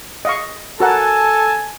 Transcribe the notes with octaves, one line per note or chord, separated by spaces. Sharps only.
D#5 F5 C#6
F#4 A4 A#4 F#5 G#5 A5